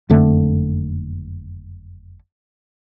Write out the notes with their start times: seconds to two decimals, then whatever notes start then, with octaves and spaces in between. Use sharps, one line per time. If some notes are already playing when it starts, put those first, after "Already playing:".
0.09 F#1 F2 D3 A3